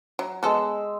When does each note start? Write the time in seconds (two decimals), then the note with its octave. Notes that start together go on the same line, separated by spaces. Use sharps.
0.19 F#3
0.43 G#3 B3 A4 E6